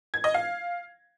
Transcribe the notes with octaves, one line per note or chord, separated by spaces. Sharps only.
G#6
D#5
F5